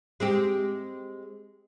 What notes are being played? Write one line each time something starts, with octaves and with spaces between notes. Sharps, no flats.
G#3 C4 G4